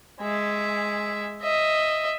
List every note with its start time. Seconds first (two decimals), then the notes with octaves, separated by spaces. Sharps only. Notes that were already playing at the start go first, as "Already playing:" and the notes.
0.21 G#3 E5
1.42 D#5 E5